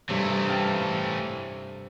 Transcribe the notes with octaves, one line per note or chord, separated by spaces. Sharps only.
G2 C3 E3 A3
F5 G5 A5